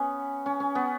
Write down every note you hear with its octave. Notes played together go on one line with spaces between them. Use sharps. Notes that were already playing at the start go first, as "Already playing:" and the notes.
Already playing: B3 C#4
C#4
C#4
B3